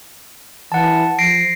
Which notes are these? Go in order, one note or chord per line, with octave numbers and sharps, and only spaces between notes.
E3 F#5 A5
F3 A#6 C7 D7